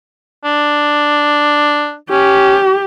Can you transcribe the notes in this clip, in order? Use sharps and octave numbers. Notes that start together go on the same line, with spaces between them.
D4
C#4 G4